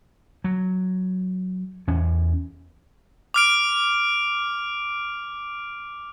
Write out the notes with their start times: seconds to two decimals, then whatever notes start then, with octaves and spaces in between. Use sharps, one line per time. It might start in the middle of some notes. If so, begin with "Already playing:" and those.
0.44 F#3
1.87 E2 C#4
3.34 D6 F6 D7